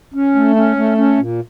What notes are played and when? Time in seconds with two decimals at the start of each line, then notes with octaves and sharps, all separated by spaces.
0.14 C#4
0.35 A3
0.56 C#4
0.76 A3
0.98 C#4
1.17 A#2